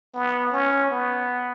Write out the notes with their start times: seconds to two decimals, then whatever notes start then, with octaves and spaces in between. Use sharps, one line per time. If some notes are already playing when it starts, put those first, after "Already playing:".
0.14 B3
0.53 C#4
0.91 B3